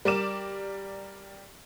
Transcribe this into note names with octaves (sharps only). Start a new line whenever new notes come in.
G3 A#4 D5 D6 E7